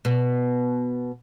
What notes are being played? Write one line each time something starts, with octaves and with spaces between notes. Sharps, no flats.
B2 B3